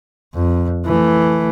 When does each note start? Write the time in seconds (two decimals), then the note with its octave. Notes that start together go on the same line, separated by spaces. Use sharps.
0.35 F2
0.86 E3 A3